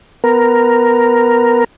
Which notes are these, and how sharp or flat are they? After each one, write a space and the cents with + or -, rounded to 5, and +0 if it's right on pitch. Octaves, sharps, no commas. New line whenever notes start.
B3 +5 A#4 +0